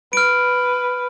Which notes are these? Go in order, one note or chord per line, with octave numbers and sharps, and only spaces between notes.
B4 F6 D7